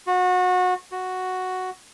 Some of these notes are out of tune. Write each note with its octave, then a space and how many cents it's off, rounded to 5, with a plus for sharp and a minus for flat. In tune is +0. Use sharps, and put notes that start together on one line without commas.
F#4 -25
F#4 +0